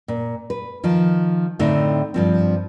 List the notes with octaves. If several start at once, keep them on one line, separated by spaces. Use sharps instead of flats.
A#2
B4
D#3 F3
A2 D3 C4 D#4 E5
G2 F3 C4